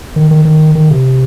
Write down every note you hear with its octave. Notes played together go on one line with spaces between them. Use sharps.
D#3
D#3
D#3
D#3
C3